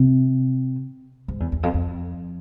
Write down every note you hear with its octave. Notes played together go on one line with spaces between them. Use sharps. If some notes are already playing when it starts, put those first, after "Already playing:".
Already playing: C3
G#2
E2
E2
F2
F2